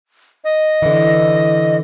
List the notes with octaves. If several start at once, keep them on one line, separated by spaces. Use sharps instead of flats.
D#5
D3 E3